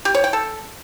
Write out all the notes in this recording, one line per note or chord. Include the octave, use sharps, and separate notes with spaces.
G4
C#5
G5
A4